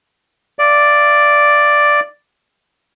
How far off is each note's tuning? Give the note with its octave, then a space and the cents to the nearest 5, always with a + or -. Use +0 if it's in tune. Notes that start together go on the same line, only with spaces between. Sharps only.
D5 +0 F5 -40